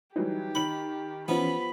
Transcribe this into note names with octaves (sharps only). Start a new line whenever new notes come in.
E3 F#3 G3 D#4 G4
D#3 B5 F#7
E3 F3 B3 C#4 B5